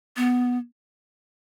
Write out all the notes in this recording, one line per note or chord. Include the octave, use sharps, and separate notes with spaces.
B3